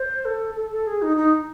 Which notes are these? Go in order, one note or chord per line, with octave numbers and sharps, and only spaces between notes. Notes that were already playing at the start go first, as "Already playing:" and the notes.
Already playing: C5
A4
A4
A4
G#4
D#4
D#4